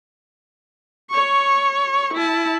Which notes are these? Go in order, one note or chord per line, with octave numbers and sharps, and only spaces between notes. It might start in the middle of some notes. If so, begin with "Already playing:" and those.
C#5 C#6
E4 A5